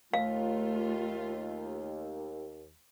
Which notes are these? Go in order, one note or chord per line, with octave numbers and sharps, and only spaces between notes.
D#2 A3 F4 F5